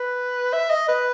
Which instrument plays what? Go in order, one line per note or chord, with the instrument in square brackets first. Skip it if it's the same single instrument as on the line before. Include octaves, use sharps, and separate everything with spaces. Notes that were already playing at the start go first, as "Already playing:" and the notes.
Already playing: [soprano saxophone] B4
E5
D#5
B4